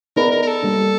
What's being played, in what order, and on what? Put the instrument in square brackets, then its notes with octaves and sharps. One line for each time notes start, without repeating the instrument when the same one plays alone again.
[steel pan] B3 D#4 G#4 B4 D5 [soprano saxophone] A#4
[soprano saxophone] A#4
A#4
A4
[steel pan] G3 A#3 D4